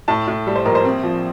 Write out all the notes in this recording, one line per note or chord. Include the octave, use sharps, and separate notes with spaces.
A2 A5
A2
G3
C5
A#1 A#4
C5
C4
F3